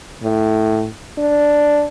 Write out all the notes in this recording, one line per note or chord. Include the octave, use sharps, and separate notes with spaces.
A2
D4